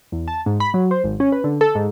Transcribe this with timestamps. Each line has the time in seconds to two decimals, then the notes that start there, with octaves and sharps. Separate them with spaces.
0.12 E2
0.28 A5
0.46 G#2
0.60 B5
0.74 F#3
0.91 C5
1.04 G#1
1.20 C#4
1.32 B4
1.44 D3
1.61 A4
1.75 G#2